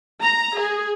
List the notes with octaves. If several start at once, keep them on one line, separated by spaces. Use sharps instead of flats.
A#5
G#4